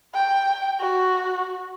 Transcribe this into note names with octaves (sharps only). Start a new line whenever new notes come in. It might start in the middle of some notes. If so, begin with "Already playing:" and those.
G5
F#4